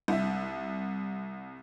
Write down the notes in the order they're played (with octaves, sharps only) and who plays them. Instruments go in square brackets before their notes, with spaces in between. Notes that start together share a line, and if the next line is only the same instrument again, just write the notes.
[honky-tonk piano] C2 E5